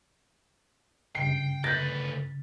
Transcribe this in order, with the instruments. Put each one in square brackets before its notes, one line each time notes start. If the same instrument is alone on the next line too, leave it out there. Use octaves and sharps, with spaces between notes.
[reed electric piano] G2 C#3 [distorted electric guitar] G5 [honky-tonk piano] C7
[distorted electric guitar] D2 B4 [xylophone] G6 A#6 [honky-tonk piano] A6